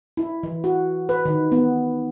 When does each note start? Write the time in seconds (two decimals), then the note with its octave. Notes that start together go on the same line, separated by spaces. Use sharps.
0.17 E4
0.43 E3
0.64 F#4
1.09 B4
1.26 D#3
1.52 B3